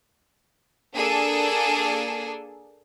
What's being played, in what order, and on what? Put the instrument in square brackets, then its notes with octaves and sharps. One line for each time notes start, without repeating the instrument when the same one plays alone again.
[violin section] A#3 D4 G#4 A4